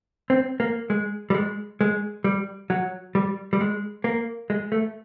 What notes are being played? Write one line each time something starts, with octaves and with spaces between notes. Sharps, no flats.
C4
A#3
G#3
G3
G#3
G#3
G3
F#3
G3
G3
G#3
A#3
G#3
A3